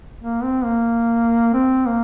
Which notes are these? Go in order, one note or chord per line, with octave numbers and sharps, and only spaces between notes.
A#3
C4
A#3
C4
A#3